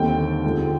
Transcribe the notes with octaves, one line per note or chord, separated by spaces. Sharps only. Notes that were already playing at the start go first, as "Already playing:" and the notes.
Already playing: D#2 D3 G3 C4 D#4 G5
F2 D3 G#3